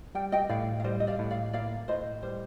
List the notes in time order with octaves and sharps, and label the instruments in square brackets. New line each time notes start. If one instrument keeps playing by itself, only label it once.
[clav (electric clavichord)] G3 [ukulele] G5
[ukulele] D#5 G5
[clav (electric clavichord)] A2 [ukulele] D5 F5
[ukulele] F5
[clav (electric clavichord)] G3 [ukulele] C5 D#5
[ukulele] D#5
D5 F5
[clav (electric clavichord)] A2
[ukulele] D5 F5
[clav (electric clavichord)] A#3 [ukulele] D5 F5
[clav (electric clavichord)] A2 [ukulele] C5 D#5
[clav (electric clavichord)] G3 [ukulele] C5